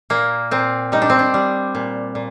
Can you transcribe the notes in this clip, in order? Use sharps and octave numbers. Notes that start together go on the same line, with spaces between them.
A#2 A#3
A#2 C4
G3 D#4
D4
C4
D4
G3
A#2
A#2